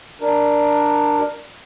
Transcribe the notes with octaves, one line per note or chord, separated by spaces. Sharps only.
D4 A#4